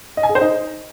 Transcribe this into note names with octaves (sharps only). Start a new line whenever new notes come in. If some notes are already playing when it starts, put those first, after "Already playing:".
D#5
G#5
G#4
C5
D#4